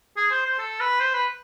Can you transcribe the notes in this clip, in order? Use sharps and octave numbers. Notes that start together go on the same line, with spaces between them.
G#4
C5
C5
A4
B4
C5
B4